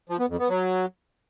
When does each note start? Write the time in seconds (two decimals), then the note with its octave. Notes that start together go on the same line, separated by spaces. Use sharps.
0.09 F3
0.19 B3
0.29 F2
0.39 B3
0.49 F#3